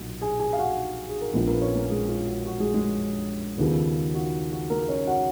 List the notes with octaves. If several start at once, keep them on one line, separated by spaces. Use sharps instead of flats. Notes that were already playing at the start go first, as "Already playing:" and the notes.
Already playing: B1 A#2 F#3 F#4
G#4 G#5
G#4 G#5
F5
F#4 F#5
G#4
A#4
A#1 A#2 F3 B3 B4
A#3 A#4
B4
C#4 C#5
A#3 A#4
G#3 G#4
F4
F#4
F#4
G#3 G#4
G#3 G#4
D#2 C#3 F3 B3
F#4
F#4
A#3 A#4
C#4 C#5
F#4 F#5